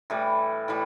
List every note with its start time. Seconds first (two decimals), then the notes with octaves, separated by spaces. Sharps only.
0.10 A2 E3 G3
0.68 A2 E3 G3